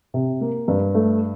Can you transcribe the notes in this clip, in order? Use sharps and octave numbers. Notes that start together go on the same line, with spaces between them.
C3
A#3
G2
A3